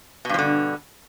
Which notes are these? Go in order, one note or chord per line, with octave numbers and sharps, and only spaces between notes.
G2 B2 D3 F3